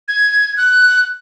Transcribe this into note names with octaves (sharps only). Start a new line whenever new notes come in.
G#6
F#6